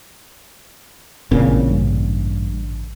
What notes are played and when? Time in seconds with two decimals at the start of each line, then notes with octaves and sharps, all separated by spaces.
1.31 A1 A#2 C#3 C4
1.70 G2